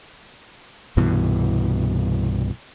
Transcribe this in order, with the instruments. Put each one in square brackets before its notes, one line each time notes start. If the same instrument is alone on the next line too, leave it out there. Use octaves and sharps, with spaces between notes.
[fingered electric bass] C2 G2 B2 E3